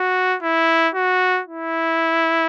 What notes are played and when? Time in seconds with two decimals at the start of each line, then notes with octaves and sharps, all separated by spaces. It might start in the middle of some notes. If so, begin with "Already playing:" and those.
Already playing: F#4
0.43 E4
0.95 F#4
1.47 E4